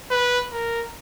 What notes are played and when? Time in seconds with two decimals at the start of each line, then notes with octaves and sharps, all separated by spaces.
0.11 B4
0.52 A#4